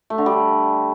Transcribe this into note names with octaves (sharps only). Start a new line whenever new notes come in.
A3
D3
G3